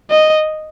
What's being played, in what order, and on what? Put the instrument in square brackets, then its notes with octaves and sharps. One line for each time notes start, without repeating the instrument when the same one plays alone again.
[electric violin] D#5